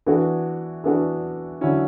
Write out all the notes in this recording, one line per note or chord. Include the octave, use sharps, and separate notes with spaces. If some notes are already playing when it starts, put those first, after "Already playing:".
E3 B3 D4 F#4
E3 B3 D4 F#4
D3 F#3 C#4 E4